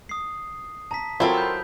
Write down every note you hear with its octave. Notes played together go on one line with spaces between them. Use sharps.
D#6 C7
A5 A#5 B6
F#3 C4 E4 F4 A4 A#4 G5 C6
B5 G6